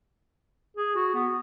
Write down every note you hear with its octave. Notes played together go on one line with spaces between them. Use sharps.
G#4
F#4
B3